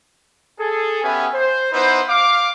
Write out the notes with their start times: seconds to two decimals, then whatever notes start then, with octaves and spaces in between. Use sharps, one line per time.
0.58 G#4 A4
1.03 B3 C#4 G4 B4 E5 G#5
1.34 C5
1.72 B3 D#4 E4 B4 C5
2.08 F5 D6